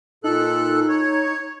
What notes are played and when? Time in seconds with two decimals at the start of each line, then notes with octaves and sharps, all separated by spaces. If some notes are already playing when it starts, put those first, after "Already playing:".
0.24 A#2 D#4 A4 F#6
0.89 C#5